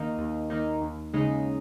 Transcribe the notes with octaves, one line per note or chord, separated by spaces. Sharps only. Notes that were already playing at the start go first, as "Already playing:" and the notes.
Already playing: D#2 D#3 A#3 D#4
D#2
D#3 A#3 D#4
D#2
C#3 G#3 D#4